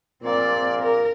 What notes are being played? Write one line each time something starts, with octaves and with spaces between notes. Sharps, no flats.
A#1 A#2 A#3 C4 D5
A#4